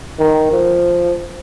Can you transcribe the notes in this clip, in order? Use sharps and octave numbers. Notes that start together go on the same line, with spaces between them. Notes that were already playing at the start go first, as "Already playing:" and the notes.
D#3
F3